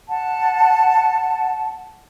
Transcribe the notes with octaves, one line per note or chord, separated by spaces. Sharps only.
F#5 A5